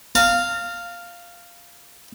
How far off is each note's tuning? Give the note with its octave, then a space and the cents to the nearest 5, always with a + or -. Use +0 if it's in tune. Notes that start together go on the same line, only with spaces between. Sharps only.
F5 -5 A#5 -45